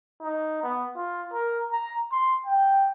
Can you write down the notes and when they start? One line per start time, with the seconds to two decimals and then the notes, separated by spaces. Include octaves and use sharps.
0.22 D#4
0.63 B3
0.96 F4
1.33 A#4
1.72 A#5
2.12 C6
2.46 G5